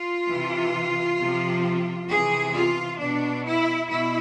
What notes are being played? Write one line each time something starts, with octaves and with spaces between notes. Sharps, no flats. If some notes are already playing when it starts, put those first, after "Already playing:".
Already playing: F4
C3 E3
C3 F3
C3 E3 G#4
F4
B2 D4
E4
B2 E4